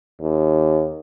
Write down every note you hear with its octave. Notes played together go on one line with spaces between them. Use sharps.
D#2